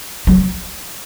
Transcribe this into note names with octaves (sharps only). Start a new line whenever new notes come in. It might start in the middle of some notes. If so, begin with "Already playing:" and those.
F#3